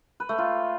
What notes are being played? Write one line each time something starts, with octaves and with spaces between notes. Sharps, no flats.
B4
A3
F4